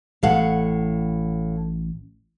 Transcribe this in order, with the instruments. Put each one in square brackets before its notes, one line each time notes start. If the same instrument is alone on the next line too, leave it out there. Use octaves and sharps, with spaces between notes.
[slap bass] A1 [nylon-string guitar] A2 F5 F#5